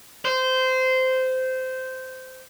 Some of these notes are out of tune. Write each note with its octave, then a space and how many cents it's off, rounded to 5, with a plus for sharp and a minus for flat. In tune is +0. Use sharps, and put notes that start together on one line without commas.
C5 -15